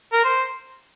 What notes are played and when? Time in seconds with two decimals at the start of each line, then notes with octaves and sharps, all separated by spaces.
0.13 A#4
0.24 C5